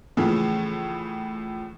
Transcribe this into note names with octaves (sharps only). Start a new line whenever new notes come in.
A2 C#3 E3 F3